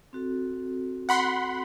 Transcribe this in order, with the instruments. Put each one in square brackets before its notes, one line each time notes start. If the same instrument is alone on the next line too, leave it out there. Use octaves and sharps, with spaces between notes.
[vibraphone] C4 F#4 A4
[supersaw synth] F#5 B5 C6